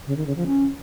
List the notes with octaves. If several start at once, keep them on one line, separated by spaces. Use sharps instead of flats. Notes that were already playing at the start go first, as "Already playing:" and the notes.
C#3
D#3
C#3
F3
C#4